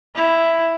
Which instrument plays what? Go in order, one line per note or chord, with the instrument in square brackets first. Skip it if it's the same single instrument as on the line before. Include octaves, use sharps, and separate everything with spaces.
[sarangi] E4